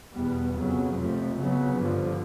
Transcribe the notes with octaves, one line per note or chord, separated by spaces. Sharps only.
E2 B2 G3 B3
F2 C#3 F#3 B3
F2 C3 F3 A3
C#3 F#3 B3
G2 D3 F3